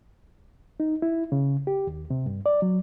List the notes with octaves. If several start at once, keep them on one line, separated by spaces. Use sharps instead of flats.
D#4
E4
C#3
G4
D#2
C3
G2
D5
F#3